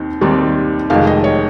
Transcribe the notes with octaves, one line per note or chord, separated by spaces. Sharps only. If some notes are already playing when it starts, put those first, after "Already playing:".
Already playing: D#2 D#3 C4 D#4
D#2 D#3 G3 C4 D#4
F1 F2 D#3 G#3 F5
D#5
C#5